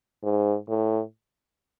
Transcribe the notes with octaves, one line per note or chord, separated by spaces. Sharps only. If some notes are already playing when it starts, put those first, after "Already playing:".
G#2
A2